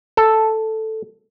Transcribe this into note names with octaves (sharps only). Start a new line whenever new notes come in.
A4